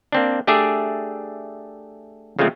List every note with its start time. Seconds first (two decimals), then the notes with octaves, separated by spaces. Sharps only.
0.12 A#3 C4 D4
0.47 A3 D4 G4 G#4 D5 E5
2.39 C#3 F3 G#3 A3 C4